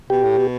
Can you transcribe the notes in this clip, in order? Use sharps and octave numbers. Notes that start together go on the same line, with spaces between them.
B2 G4
A2
B2